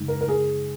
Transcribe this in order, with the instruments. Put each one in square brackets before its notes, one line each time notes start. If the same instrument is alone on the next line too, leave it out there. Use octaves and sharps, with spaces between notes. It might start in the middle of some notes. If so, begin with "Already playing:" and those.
Already playing: [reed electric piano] F#2 C#3 G#3 D#4
[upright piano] A#4
A#4
G#4